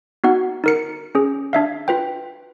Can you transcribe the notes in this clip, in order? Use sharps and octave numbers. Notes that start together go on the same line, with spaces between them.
B3 D#4 F#4 F#5
D#4 A#4 C#7
C#4 G#4
D4 E5 F5
F4 B4 G5